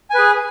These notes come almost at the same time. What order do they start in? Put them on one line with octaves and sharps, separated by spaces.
G#5 B4 G#4